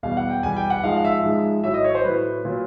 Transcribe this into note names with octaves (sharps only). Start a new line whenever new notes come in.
E2 B2 G3 F5
F#5
G5
E2 B2 G3 G#5
G5
F#5
G#2 F3 G#3 F5
F5
E5
G#2 F3 G#3
A2 F#3 E5
D#5
C#5
C5
A2 F#3 B4
A#2 F#3